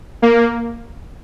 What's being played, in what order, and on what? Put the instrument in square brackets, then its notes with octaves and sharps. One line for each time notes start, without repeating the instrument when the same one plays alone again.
[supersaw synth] A#3